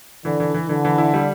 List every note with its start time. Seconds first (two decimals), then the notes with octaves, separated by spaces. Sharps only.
0.25 D3 E3
0.40 E3
0.54 E3
0.69 D3 E3
0.85 E3
0.98 E4
1.14 G3